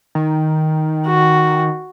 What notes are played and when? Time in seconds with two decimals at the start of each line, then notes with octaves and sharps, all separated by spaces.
0.15 D#3
1.05 F#4